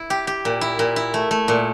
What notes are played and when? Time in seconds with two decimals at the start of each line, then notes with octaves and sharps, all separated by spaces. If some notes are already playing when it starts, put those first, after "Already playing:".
Already playing: E4
0.10 G4
0.27 G4
0.45 A#2
0.61 E4
0.79 A#2
0.96 E4
1.14 A3
1.31 A3
1.48 A#2